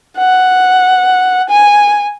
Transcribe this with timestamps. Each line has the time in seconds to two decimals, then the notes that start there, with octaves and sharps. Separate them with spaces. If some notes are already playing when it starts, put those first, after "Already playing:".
0.18 F#5
1.49 G#5